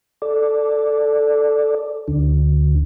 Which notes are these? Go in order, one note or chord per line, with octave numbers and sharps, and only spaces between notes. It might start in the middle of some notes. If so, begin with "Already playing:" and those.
A4 D5
D2 D3